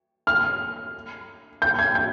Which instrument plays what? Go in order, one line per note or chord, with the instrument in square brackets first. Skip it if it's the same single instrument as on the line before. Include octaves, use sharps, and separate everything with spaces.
[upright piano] F6
G6
G#6
G6